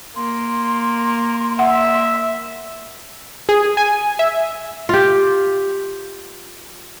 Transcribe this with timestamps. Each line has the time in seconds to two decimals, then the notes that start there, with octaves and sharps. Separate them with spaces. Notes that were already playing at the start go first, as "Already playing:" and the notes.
0.16 A#3 C6
1.59 E5 F#5
3.49 G#4
3.77 G#5
4.19 E5
4.89 F4 G4